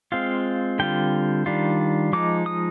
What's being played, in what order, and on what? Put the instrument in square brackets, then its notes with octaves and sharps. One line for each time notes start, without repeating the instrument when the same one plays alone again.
[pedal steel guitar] G#3 C4 F4 F5
D3 G3 C4 F4 G5
D#3 G3 D4 F4
F3 G#3 D#4 D6
D#6